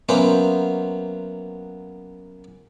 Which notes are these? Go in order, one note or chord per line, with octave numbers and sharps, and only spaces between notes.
F#3 A#3 B3 C#4 C5 E5